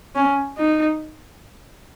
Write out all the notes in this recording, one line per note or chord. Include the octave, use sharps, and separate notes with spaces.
C#4
D#4